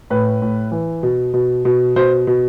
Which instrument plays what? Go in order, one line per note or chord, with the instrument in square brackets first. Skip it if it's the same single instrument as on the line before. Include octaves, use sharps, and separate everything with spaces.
[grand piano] A2 B4
A2
E3
B2
B2
B2
B2 C5
B2